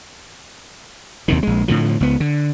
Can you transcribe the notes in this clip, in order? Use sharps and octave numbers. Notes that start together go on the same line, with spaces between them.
D#2 C3 D#3
A#1 G#3
A2 D3 F3
C#2 B3
D3